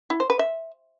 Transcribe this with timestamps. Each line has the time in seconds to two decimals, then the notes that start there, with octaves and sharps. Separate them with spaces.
0.10 E4
0.20 C5
0.30 B4
0.39 E5